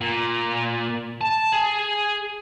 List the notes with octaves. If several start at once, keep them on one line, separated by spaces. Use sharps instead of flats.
A#2
A5
G#4